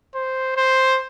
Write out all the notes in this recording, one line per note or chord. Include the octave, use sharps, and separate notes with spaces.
C5
C5